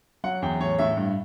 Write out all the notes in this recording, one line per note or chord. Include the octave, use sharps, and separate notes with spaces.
F#3 F#5
E2 G5
A2 C#5
A2 E5
G2